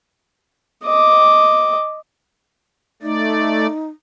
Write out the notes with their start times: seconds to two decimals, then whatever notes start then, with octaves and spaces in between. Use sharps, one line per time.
0.84 D#5 D6
3.02 A3 D#4 D5